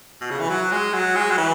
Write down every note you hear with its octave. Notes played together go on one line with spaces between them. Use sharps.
B2
C#3
E3
F#3
G#3
F#3
G#3
F#3
E3